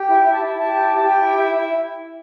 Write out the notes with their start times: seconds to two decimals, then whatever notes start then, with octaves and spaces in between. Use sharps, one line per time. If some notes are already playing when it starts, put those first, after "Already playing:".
Already playing: G4
0.08 E4 G5
0.27 E4
0.33 A5
0.45 E4
0.57 A5
0.64 G4
0.82 E4
1.01 G4
1.20 E4
1.38 E4
1.56 E4